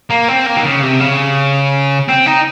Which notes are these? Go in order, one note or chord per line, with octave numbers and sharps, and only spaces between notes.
A#3
C4
A#3
D#3
C#3
C3
C#3
C4
D#4